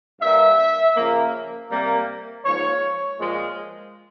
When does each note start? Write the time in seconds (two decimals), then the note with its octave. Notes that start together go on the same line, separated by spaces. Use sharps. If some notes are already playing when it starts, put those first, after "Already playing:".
0.21 G2 G3 A#3 E5
0.96 C#3 F3 A#3
1.70 C3 G3 A#3
2.45 G#2 F3 A#3 C#5
3.19 A#2 F3 G#3